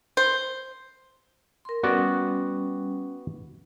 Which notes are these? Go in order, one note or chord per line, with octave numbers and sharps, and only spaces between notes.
C5
A#4 C6
G3 B3 C#4 F#4 D5